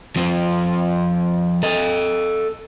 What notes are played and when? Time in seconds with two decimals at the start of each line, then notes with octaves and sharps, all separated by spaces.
0.16 F3 C4
1.63 A4 D#5